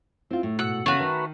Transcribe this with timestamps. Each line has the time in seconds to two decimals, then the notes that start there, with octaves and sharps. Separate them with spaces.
0.31 C4 E4 F4
0.43 A2
0.59 G#2 B2 F#4 F#5 E6
0.86 C#3 E3 A3 B3 F#4
1.00 D#3 D#4 B4 A#5 B5